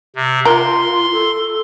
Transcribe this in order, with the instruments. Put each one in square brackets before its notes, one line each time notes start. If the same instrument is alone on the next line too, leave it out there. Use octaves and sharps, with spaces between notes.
[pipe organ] C3
[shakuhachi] F4 [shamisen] A#4 [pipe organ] C6
[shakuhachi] A4